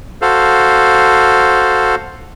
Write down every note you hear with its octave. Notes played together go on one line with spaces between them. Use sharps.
F#4 A4 C5 F5